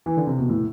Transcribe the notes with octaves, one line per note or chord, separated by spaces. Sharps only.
E3
D3
C3
B2
A2